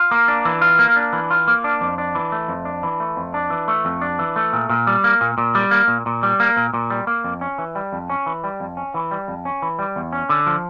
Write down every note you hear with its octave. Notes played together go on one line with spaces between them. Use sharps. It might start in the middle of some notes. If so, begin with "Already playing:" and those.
Already playing: F4
A#3
D4
E3
F4
A#3
D4
E3
F4
A#3
D4
F2
D4
E3
A3
F2
D4
E3
A3
F2
D4
E3
A3
F2
D4
E3
A3
A#2
A#2
G3
A#3
A#2
A#2
G3
A#3
A#2
A#2
G3
A#3
A#2
A#2
G3
A#3
F2
C#4
E3
G3
F2
C#4
E3
G3
F2
C#4
E3
G3
F2
C#4
E3
G3
E2
C#4
D3
F3